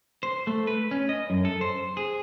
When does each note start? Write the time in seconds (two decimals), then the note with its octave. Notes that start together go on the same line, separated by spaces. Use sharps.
0.23 C5
0.47 A3
0.67 B4
0.91 C#4
1.09 D#5
1.30 F#2
1.45 A4
1.61 C5
1.97 G#4